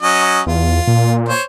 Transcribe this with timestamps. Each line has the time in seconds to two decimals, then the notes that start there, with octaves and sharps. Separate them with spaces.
0.02 F#3 C#4 D#5
0.47 E2 F4
0.87 A#2
1.29 C5 C#5